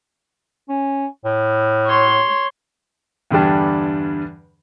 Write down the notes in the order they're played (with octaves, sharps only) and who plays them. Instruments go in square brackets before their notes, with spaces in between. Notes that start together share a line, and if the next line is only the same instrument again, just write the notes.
[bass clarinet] C#4
A2
[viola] C#5 C6
[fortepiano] E2 G2 D3 G3 D4